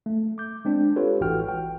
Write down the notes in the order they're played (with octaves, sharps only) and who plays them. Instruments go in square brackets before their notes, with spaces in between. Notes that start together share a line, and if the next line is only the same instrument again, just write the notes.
[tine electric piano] A3
D6 G6
G#3 C4 D4
F4 G4 A4 B4 C#5
A1 E3 F#4 G5 F6
G5